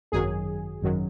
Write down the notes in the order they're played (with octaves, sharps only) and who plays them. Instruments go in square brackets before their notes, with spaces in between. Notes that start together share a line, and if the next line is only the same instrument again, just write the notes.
[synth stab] G#1 F#2 D#3 F#3 G#4
G#1 F#2 D#3 F#3